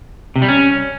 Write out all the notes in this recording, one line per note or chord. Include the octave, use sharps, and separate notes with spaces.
C3
G3
C#4